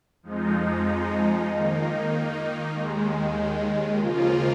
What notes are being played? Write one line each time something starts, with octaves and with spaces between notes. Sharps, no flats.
F2 F3 G#3 D#4
D#3 A#3 D#4
D#2 D#3 G#3
C#3 F3 A#3 F4